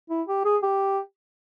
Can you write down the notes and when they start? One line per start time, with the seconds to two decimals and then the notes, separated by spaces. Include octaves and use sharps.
0.10 E4
0.28 G4
0.45 G#4
0.62 G4